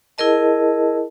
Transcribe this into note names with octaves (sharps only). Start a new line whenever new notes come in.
E4 G#4 A#4 D#5 A5